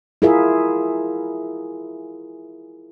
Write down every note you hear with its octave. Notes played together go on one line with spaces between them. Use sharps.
E4 F4 G#4 A#4 E5